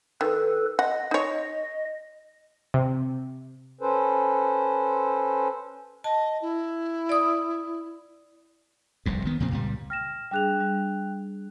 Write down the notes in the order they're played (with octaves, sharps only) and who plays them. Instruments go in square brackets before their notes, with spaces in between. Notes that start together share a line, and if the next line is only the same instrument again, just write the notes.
[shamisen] D#3 [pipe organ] A4 B4
[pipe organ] D#5 [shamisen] F#5
[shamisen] D#4 C#5
[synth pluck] C3
[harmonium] C#4 A4 B4 C5
[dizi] D#5 [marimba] A5
[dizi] E4
[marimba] D5 D#6
[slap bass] F1 C2 G#2
D#3 B3
F2 A#2 C#3 C4
C#2 A#2 G3
[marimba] G5 [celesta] F6 A#6 E7
[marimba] G3 D4 G#4 [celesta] G5 F#6 F7
[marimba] G3 D4